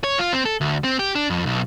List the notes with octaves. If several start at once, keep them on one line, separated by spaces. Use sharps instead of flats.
C#5
F4
C4
A4
D2
C4
G4
D4
F2
B1